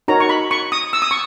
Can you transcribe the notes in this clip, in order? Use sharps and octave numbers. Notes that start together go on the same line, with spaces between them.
D#4 F#4 A#4 C#5 A#5
C#6
B5
C#6
D#6
E6
D#6
C#6